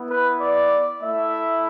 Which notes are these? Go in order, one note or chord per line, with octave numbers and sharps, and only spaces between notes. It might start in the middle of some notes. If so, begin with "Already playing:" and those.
Already playing: B3 E4
B4
D5
A3 E4 E5